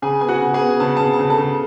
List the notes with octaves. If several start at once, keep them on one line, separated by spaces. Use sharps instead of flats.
C#3 G#4 G#5
B3 G#5
F#4 F#5
C#3
G#4 G#5
B3
C#3 A5
C#3 A5
A5
C#3
A4 A5
C#3